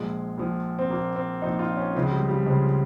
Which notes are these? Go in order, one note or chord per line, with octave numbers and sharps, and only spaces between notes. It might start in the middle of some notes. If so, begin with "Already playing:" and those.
Already playing: A#1 A#2 F3 G#3
A#1 A#2 F3
C4
A#1 A#2 F3 A#3
C4
A#1 A#2 F3 D#4
F4
C#4
C#2 C#3 F3 C4
G#3
G3
G3
C#2 C#3 F3 G#3